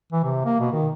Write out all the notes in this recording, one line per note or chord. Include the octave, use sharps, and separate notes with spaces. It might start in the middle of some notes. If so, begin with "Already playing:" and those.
E3
C3
A#3
B2
D#3